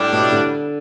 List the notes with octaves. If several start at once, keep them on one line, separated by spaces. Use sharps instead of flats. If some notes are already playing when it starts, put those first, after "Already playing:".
Already playing: A2 G3 D4
B2
D3